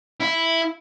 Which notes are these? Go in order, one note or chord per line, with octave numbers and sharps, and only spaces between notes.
E4